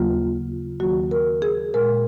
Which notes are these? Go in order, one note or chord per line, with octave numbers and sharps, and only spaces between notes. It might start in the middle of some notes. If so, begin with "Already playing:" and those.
Already playing: D#2 C#3 F#3 A#3 F4
D#2 D#3 F#3 A#3 F#4
A#4
G#4
A#2 G#3 A#4